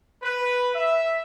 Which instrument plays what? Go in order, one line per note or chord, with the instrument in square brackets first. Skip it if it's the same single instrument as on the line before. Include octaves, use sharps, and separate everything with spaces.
[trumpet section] B4
E5